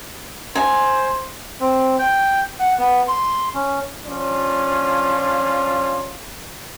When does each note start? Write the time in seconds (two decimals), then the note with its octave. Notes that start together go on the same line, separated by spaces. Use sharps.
0.55 C5 G#5
1.60 C4
1.99 G5
2.59 F#5
2.78 B3
3.08 C6
3.54 C#4
4.06 F3 C#4 D4 F4